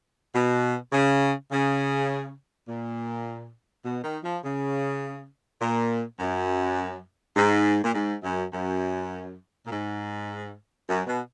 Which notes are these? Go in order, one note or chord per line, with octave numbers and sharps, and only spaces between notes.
B2
C#3
C#3
A#2
B2
D#3
F3
C#3
A#2
F#2
G#2
A#2
G#2
F#2
F#2
A#2
G#2
F#2
B2